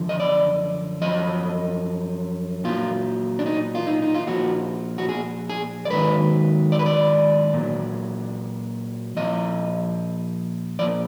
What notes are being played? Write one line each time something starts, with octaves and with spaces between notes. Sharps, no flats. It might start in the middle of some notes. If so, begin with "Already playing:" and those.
Already playing: F#2 D3 F3
D#5
D5
F#2 F3 D#5
A#2 F#3 F4
D4
D#4
F4
D#4
D#4
F4
A#2 F3 F#4
F#4
G#4
G#4
D5
G#2 D#3 F#3 B4
D5
B4
D5
A#2 F#3
A#2 F3 D#5
A#2 F3 D5